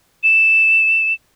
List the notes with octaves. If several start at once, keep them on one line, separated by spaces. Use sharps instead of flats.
E7